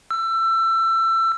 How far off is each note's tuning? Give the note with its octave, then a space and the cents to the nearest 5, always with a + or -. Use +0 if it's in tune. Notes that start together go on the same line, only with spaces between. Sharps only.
E6 +25